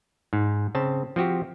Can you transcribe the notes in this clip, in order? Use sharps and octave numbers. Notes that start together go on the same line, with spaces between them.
G#2
C#3 C4 A5
F3 C4 F#4 G4